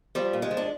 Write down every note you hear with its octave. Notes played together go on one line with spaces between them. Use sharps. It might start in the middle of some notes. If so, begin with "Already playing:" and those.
F3 G3
A#2
G#3
F3
D4